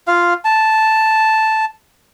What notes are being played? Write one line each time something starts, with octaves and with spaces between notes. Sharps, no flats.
F4 F5
A5